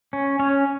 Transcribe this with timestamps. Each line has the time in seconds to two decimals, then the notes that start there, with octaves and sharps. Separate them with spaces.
0.13 C#4
0.39 C#4 C#5